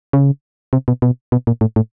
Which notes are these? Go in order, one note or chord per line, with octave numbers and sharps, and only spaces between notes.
C#3
C3
B2
B2
B2
A#2
A2
A2